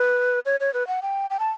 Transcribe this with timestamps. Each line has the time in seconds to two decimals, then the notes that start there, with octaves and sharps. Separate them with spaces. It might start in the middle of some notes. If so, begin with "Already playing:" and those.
Already playing: B4
0.46 C#5
0.60 C#5
0.74 B4
0.87 F#5
1.02 G5
1.30 G5
1.40 A5